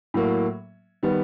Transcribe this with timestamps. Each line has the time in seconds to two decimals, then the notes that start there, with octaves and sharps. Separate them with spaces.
0.14 A2 F#3 A#3
1.03 D#3 G3 B3